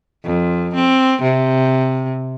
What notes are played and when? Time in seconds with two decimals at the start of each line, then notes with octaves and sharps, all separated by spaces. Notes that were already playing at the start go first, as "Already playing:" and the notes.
0.24 F2
0.75 C4
1.22 C3